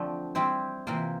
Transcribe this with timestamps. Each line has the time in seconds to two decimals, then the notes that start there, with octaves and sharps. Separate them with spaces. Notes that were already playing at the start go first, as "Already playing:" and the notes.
Already playing: D3 F3 A3 C4 G4
0.35 G3 C4 E4 G4 C5
0.87 C3 E3 A#3 F4 C5